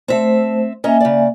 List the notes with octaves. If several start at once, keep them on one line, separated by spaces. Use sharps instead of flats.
A3 C4 C5 E5
A#3 C#4 D#5 E5 G#5 A#5
C#3 D5